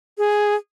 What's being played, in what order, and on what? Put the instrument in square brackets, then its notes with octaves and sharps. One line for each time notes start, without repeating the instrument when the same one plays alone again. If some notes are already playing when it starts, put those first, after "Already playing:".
[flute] G#4